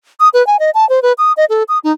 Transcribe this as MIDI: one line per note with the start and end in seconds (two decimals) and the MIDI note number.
0.20 0.29 87
0.34 0.45 71
0.47 0.57 80
0.60 0.70 75
0.74 0.88 81
0.89 1.02 72
1.02 1.13 71
1.18 1.33 87
1.37 1.45 75
1.50 1.63 69
1.68 1.79 87
1.84 1.93 63